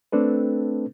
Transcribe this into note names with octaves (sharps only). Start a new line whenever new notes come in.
A3 C4 D4 A4 B4